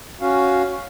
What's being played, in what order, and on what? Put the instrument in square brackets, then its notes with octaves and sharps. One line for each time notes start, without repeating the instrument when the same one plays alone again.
[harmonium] C#4 F#4 F5